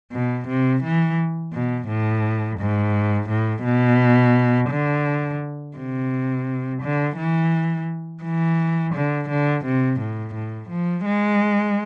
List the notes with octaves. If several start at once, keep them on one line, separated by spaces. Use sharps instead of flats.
B2
C3
E3
B2
A2
G#2
A2
B2
D3
C3
D3
E3
E3
D3
D3
C3
A2
A2
F3
G#3